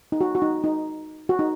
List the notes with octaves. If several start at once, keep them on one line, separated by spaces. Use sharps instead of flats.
D#4
F#4
F#4
D#4
D#4
F#4
D#4